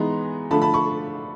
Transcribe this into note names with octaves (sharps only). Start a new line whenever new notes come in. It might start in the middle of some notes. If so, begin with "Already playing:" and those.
Already playing: E3 G#3 B3 D#4 A#5 C6
D3 F3 A3 A5 B5
A5 B5
B5 C#6